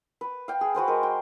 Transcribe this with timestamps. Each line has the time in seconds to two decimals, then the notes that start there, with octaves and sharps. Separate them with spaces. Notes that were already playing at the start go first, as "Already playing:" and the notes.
0.21 B4
0.48 F5 G5
0.61 G#4
0.75 F#4 B4 C5 G5
0.88 G#3 A#4
1.03 G5